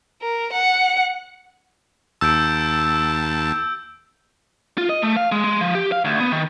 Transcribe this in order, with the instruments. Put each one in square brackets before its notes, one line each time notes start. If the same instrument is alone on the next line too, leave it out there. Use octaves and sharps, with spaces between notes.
[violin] A#4
F#5
[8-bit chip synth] D#2 A5 [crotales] E6 G6 D7
[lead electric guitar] F4
D#5
A3
F5
G#3
G#3
F3
G4
F5
D2
B3
D#3